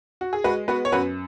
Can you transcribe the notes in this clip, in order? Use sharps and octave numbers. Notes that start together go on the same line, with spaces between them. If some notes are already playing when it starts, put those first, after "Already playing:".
F#4
G#4
G#3 F#4 B4
B3 F#4 B4
C#5
F#2 F#4 B4